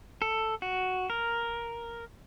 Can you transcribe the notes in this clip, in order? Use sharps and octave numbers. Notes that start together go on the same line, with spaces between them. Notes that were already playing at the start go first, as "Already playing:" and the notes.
A4
F#4
A#4